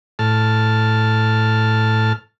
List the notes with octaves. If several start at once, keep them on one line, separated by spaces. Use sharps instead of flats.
A2 A5 F6